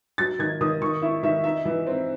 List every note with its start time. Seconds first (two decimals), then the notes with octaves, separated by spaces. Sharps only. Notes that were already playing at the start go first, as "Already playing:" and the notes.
0.18 F#3 A6
0.39 D#3 G#6
0.61 D#3 D#6
0.81 D#3 C#6
1.02 E4 E5
1.23 D#3 E5
1.44 D#4 E5
1.65 E3
1.87 C4